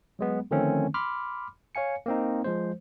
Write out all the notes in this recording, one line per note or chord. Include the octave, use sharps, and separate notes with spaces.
F#3 G#3 B3
D3 D#3 F3 A3 C4 C#4
B5 C6 D6 F6
C#5 F5 G#5 C#7
A#3 C4 D#4
F3 G#3 C5